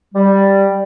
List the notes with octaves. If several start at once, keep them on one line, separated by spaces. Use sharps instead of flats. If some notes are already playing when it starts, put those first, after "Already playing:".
G3